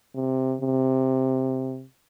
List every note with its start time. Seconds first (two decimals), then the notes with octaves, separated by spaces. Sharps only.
0.15 C3
0.61 C3